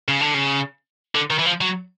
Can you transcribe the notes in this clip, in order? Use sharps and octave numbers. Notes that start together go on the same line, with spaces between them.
C#3
D3
C#3
D3
D#3
E3
F3
F#3